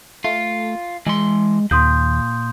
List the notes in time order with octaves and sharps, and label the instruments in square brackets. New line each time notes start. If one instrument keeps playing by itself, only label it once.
[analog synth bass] A3 [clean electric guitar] F4
[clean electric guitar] E3 C6 [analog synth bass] G#3
[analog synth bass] D#2 [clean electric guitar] A#2 [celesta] C6 D#6 G6